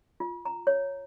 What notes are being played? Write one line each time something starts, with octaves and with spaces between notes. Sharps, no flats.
F4
A#5
C#5